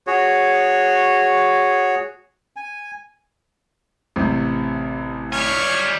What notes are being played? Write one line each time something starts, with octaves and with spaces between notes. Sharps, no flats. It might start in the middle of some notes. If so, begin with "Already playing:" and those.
F#4 G#4 C#5
G#5
A1 C3
G3 C#5 G#5 F6